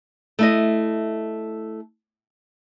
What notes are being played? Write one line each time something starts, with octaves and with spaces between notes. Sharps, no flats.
A3 E4 D#5